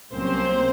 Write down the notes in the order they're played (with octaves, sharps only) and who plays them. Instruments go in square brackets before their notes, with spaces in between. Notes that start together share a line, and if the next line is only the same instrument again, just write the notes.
[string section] C2 B2 F#3 A#3 C#4 [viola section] C4 C5